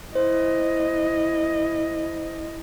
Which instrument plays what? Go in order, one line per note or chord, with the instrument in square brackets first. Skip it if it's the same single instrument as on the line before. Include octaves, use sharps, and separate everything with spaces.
[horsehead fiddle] E4 D#5 [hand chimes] C5